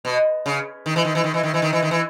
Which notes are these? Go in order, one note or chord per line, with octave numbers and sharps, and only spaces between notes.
B2
C#3
D#3
E3
D#3
E3
D#3
E3
D#3
E3
D#3
E3
D#3
E3